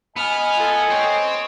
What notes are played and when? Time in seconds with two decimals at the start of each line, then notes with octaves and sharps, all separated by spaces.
0.17 B3 D#5 G#5 F6
0.57 F4 A4
0.90 C4 C#5